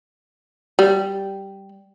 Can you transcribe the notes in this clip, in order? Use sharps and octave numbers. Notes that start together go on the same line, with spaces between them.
G3